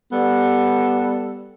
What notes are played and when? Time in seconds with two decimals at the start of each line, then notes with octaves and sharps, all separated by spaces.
0.12 G3 B3 A4